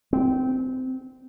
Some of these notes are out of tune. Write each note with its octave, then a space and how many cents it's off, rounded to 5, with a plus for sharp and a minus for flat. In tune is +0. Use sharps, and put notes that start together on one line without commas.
C4 -20